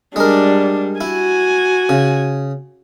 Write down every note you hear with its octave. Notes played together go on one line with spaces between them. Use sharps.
G3 G#3 D4 A#4
E4 F#4 G#5
C#3